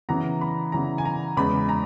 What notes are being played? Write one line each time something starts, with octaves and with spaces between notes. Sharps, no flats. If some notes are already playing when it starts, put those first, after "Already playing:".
C#3 E3 B3 A#5
B5
C#3 E3 B3 A#5
G#5
A#5
E2 C#3 G#3 B5
A#5